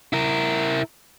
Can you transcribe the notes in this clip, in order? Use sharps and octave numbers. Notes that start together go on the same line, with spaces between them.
E4 A#4